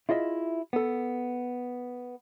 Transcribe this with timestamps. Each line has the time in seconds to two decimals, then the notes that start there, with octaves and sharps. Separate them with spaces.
0.09 E4 F4 G#4 D#5 E5
0.73 B3 A4